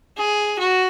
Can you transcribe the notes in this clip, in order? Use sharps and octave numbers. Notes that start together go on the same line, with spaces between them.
G#4
F#4